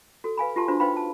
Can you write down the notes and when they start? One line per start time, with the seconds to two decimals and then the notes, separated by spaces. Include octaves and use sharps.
0.24 F#4 A4
0.37 B4 F5 G#5 B5
0.56 F4 G4 A5 C6
0.68 D4 F4 F#4 C5 C6
0.80 D#4 B4 C5 F5 G5 B5
0.97 A5